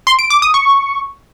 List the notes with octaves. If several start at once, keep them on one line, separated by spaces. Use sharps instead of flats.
C6
D7
D6
D#6
C#6